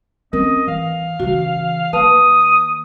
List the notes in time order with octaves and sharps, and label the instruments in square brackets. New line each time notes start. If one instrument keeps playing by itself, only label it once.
[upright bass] C4 C#4 [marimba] A#4 [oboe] D#5
[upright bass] E3 [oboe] F5
[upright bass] C#3 E3 [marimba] F#4
[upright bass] D#3 A#3 [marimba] B4 F5 A5 [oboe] D#6